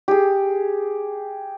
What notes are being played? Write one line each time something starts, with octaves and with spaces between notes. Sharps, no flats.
G4 G#4